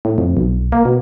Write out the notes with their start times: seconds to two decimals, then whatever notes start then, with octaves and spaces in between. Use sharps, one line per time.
0.05 A2
0.18 F2
0.37 B1
0.72 A#3
0.85 B2